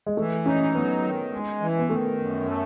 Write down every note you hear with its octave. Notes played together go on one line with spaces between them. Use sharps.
G#3
E3 A3
C#4 D#4
F#3 B3
D#3
G#3
E3
B3
D#3 A3
F#2
A3